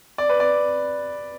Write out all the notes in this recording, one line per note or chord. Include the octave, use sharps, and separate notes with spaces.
D5
B4
D5